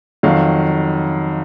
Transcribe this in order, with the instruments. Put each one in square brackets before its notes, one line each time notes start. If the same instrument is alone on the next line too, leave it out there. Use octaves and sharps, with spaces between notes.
[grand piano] F2 D#3 F#3 F5